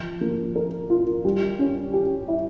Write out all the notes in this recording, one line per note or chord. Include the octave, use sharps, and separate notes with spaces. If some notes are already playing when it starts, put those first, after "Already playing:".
Already playing: F3
A#3
A#4
F4
G3
C#4
G4
E4